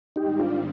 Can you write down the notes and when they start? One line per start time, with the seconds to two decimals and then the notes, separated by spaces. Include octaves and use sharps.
0.16 G#2 D#3 G3 C4 D#4 G4
0.39 D4 F4